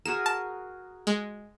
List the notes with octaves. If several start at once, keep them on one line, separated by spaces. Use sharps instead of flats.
F#4 G#4 A#4 E7
A5
G#3